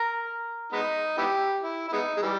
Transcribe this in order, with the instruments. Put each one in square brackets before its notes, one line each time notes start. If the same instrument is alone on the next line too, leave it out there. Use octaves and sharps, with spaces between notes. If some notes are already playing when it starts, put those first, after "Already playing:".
Already playing: [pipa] A#4
[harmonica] G#3 B3 D#4
B3 E4 G4
E4
E4
G#3 B3 D#4
G#3
E3 G3